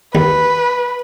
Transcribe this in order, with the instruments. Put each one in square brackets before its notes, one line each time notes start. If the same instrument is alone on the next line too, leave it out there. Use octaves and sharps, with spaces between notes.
[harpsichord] D#2 [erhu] B4